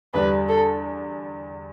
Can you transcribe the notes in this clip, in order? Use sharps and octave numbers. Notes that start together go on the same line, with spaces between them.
E2 D3 G3 D4 B4
A4